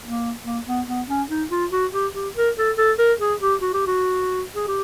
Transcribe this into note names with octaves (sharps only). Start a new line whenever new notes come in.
A#3
A#3
B3
B3
C#4
D#4
F4
F#4
G4
G4
A#4
A4
A4
A#4
G#4
G4
F#4
G4
F#4
G#4
G4